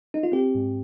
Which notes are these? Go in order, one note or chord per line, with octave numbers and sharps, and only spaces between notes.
D#4
F4
C4 G4
G#2